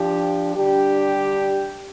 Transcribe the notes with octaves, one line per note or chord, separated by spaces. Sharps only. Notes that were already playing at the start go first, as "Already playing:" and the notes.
Already playing: F3 D4 G4
D3 G3 D4 G4